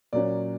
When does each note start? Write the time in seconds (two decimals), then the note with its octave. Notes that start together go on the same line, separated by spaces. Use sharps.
0.13 A#2 F#3 A#3 C#4 D5